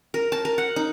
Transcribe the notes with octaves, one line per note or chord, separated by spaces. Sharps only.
A#4
A5
A#4
F#5
D#4